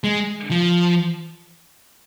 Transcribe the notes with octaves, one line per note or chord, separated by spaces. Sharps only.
G#3
F3